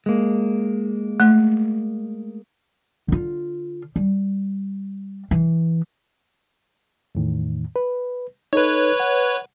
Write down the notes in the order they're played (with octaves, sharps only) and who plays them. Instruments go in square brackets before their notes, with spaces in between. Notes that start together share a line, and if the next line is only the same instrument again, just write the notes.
[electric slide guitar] G#3 A#3
[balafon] A3
[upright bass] D3 F4
G3
E3
[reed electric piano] E2 A2 D#3
B4
[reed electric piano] D#4 A4 [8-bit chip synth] B4 C#5
[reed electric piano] F#5